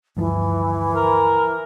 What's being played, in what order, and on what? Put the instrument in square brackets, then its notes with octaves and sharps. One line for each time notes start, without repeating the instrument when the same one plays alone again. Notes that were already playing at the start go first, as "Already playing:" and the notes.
[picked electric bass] D2 G2 F3 [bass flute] E3
[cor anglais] A#4